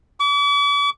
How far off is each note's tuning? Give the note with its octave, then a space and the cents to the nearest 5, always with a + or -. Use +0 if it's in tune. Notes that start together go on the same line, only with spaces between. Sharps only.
D6 -45